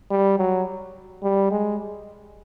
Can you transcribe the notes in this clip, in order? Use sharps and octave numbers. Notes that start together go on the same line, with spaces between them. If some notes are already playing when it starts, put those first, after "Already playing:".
G3
F#3
G3
G#3